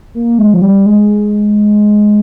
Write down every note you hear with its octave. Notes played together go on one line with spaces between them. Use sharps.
A#3
G#3
F3
G3
G#3